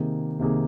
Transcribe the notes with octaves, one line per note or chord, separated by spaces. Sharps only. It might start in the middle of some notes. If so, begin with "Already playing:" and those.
Already playing: C3 D#3 A#3 G#4
C3 D#3 A#3 G#4